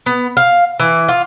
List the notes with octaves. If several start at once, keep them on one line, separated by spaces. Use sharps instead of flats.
B3
F5
E3
F4